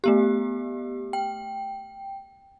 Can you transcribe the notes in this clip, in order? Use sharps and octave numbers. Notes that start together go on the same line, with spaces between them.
A3 B3 G4
G5